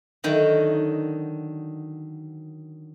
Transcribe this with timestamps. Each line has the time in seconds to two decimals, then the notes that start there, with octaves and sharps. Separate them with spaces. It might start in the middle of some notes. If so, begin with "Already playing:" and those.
0.24 D3 D#3 F#3 D#4